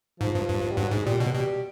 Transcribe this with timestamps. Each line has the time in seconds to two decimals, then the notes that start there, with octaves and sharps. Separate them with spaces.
0.20 G#2 F3
0.35 G2
0.49 G2
0.71 G3
0.77 G2 F#3
0.91 G#2 G#3
1.06 A#2 G3
1.20 B2 F#3
1.33 B2 G3